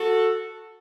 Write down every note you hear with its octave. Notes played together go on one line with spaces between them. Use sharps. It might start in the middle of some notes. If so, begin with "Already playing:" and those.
Already playing: F#4 A4